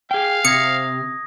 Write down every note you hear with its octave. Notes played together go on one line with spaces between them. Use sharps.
G#4 F5 G5
C3 D#6 G#6 A#6 C#7